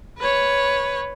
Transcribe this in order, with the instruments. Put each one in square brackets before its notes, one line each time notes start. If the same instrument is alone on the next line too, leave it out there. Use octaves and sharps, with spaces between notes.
[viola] B4 C#5